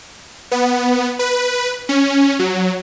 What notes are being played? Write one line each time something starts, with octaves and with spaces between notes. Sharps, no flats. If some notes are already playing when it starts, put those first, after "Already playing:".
B3
B4
C#4
F#3